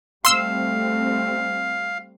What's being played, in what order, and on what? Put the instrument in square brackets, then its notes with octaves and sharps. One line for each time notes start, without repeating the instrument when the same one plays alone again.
[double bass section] G3 A3 C4 [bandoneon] F5 [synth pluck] C6 E6